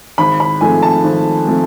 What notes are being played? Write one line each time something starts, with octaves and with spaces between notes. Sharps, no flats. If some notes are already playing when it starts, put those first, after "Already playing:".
G#1 B5
B5
G#2 F3 A3 C4 G#5
A5
G#1
F3 A3 C4